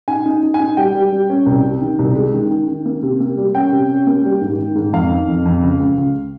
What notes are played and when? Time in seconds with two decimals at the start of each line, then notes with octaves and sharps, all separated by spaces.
0.08 D#4 G#5
0.26 D#4
0.31 G#5
0.43 D#4
0.54 G#5
0.60 D#4
0.77 G3 G5
0.94 G3
1.12 G3
1.30 C#4
1.46 C2
1.63 C3
1.81 D#3
1.99 C2
2.15 G#3
2.34 D#3
2.51 D#3
2.68 D#3
2.86 A#3
3.03 C3
3.20 A#3
3.37 G3
3.54 C#4 G5
3.72 C3
3.89 C#4
4.07 A#3
4.24 G3
4.41 G#2
4.59 D#3
4.75 G#2
4.93 F2 F5
5.11 D#3
5.28 F2
5.46 F2
5.63 C#2
5.80 C#2
5.97 C#2